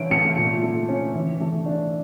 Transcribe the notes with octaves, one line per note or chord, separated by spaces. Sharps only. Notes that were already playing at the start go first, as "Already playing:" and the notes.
Already playing: E3 C#4 D7
A3 C#7
A#2
A3
C#4
E3
A3
D4